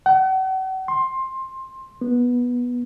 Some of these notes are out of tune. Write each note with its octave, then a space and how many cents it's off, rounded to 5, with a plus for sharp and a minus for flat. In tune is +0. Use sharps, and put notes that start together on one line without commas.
F#5 +40
C6 +15
B3 -15